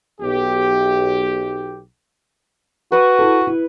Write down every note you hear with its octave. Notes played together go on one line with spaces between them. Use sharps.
B1 G4
F#4 B4 C#6 D#6
E4 A4
E4